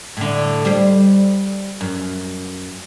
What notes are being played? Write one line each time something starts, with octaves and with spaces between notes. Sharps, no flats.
A2 D3
G3 C5
F#2